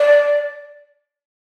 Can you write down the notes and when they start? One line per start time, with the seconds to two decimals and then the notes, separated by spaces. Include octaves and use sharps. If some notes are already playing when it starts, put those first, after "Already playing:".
Already playing: D5